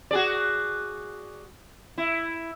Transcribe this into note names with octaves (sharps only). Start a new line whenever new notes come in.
F#4 G#4 D5
E4